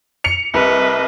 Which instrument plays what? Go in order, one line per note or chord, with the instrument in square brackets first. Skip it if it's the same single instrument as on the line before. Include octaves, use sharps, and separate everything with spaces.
[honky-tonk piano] C#7 F7
[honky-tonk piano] C2 [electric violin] B4 D#5